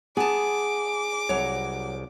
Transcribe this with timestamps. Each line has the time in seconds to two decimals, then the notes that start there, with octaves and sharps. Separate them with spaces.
0.17 B3 G#4 A5 D6
1.29 C2 F#3 C#5